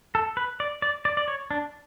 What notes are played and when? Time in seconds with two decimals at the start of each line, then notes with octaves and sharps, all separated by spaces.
0.15 A4
0.37 B4
0.60 D5
0.82 D5
1.05 D5
1.17 D5
1.28 C#5
1.51 D4